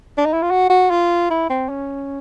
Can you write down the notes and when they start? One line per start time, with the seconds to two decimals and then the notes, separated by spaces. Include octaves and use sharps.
0.17 D4
0.26 D#4
0.33 E4
0.42 F4
0.50 F#4
0.70 F#4
0.90 F4
1.30 E4
1.50 C4
1.69 C#4